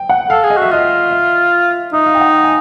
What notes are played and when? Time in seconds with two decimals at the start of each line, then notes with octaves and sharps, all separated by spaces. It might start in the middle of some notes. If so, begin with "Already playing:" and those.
Already playing: G5
0.09 F#5
0.30 A4 F5
0.43 G#4
0.50 D#5
0.57 F#4 E5
0.71 F4 D#5
1.11 E5
1.93 D#4 E5
2.06 F5
2.15 G5
2.20 F#5
2.33 G5
2.44 G#5